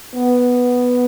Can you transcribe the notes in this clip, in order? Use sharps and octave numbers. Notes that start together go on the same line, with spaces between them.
B3